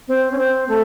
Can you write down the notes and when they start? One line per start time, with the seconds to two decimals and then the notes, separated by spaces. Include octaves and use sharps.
0.08 C4
0.31 C#4
0.38 C4
0.68 A3